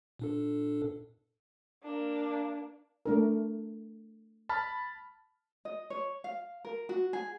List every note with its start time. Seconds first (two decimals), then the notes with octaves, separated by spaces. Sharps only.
0.19 A#2 D4 A4
1.83 A#3 D4
3.06 A3 D4 A#4
4.49 A5 B5 F6
5.65 D#5
5.90 C#5
6.24 F5
6.65 A#4
6.89 F#4
7.13 G#4